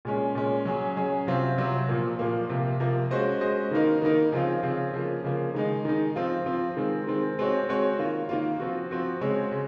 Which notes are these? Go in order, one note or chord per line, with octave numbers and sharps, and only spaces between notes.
A#2 G#3 C#4
A#2 G#3 C#4
F#3 C#4 G#4
F#3 C#4 G#4
C3 F#3 C4 F4
C3 F#3 C4 F4
A#2 F3 A#3
A#2 F3 A#3
C3 F3 A#3
C3 F3 A#3
G#3 C#4 F#4 C5 D#5
G#3 C#4 F#4 C5 D#5
D#3 A#3 D#4 A#4
D#3 A#3 D#4 A#4
C#3 F3 C4 F4
C#3 F3 C4 F4
C#3 F3 A#3
C#3 F3 A#3
D#3 G#3 D#4
D#3 G#3 D#4
F3 C4 F4
F3 C4 F4
D#3 G#3 C4
D#3 G#3 C4
G#3 C4 F#4 C#5
G#3 C4 F#4 C#5
D#3 A#3 F4
D#3 A#3 F4
F3 C4 F#4
F3 C4 F#4
C#3 G#3 C4 F#4 C#5
C#3